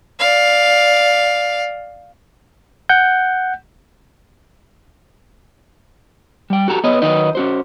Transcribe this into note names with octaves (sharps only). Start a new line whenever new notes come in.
D5 F5
F#5 G6
G3 G5
F#4 G4 A4 A#5
B3 G#4 B4 C#5 D#5
D#3 F#3 D#4 B4 D#5
C#4 F#4 C5